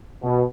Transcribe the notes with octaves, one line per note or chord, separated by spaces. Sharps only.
B2